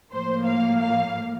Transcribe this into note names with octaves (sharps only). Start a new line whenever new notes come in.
A2 F3 A#3 C5
F5
F5